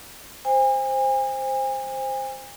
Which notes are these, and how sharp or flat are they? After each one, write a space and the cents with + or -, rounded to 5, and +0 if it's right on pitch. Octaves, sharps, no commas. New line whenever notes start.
C5 +0 G#5 -40